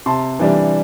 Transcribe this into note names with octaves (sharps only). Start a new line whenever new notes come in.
C3 A5 C6
E3 G3 D4